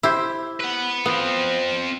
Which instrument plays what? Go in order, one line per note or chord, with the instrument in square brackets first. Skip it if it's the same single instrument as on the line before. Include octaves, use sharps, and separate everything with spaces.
[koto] E4 G4 C5
[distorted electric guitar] B4 F#5
[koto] B3 [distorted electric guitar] C4 F4